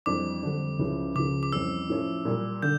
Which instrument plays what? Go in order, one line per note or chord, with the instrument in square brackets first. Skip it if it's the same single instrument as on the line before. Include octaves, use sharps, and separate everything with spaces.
[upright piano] F2 E3 G3 D4 [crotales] D6
[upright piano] F2 D3 G3 D4
C#2 C#3 F3 C#4 E4
[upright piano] C#2 C#3 F3 [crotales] D6
[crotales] D6
[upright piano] F2 E3 G3 C#4 [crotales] E6
[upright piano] A2 F3 C#4 E4
A#2 G3 A#3
[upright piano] D3 [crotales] G6